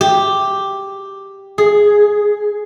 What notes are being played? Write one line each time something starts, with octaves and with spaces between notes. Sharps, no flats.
G4
G#4